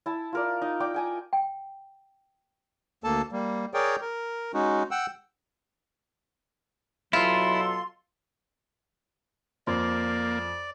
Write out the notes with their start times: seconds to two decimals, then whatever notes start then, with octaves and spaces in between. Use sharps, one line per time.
0.06 E4 A5
0.33 F4 A#4 D5
0.62 D#4
0.80 D5 G5 D6
0.94 G5 G#5 A#5
1.33 G5
3.04 D2 A#3 A4 A5
3.32 G3 A#3
3.74 G#4 A#4 C#5 D5 G5
4.01 A#4
4.54 G#3 C#4 D#4 F#4
4.91 F#5 G5 E6
7.13 B2 F#3 E4 F4 A4 C6
9.67 F2 A#3 D5 C6